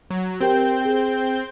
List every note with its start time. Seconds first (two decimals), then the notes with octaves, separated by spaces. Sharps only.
0.10 F#3
0.41 C4 G4 A#4 G5 G6
0.81 G#4 G5